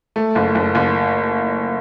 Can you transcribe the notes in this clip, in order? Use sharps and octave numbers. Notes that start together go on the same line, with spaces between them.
A3
F#1
F#1
F#1